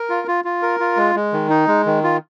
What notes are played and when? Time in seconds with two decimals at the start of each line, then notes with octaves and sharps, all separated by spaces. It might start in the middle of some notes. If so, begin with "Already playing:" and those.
Already playing: A#4
0.10 F4
0.28 F4
0.45 F4
0.63 A#4
0.80 F4
0.97 G#3
1.15 G#3
1.33 D#3
1.50 D#4
1.68 G#3
1.86 D#3
2.03 F4